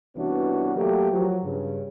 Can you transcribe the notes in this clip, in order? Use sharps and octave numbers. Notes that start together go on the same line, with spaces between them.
C2 E3 B3 C#4 D4 F#4
F#3 A3 A#3 G4
F3 F#3
G2 C#3